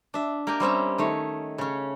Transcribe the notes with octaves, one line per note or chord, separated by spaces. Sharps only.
D4 E5
A#3 G4 A#4 G5 G#5
G3 C4 C#4 E5
D#3 A3 C#5
C#3 C#4